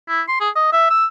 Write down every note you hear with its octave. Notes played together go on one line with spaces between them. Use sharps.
E4
C6
G#4
D#5
E5
E6